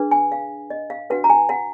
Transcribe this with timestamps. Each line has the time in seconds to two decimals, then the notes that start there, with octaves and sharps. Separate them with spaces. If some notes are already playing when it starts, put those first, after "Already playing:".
Already playing: D4 G#4 B4
0.11 G#5
0.32 F5
0.70 D#5
0.90 F5
1.10 D4 F#4 B4 F#5
1.24 A#5
1.30 G#5
1.49 F#5